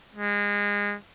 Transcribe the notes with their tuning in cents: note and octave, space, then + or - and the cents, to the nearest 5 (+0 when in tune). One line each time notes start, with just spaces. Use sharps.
G#3 -25